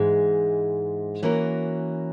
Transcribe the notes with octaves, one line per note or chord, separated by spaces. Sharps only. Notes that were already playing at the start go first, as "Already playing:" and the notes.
Already playing: G#2 E3 G#3
E3 A#3 C#4 F#4 A#4